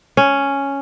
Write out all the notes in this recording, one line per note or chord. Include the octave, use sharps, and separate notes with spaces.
C#4